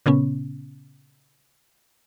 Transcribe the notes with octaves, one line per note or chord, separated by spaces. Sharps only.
A#2 C#3 B3 C#4